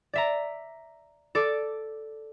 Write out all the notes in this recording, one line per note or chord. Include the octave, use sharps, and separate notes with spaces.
D5 E5 A#5
A4 D5 D6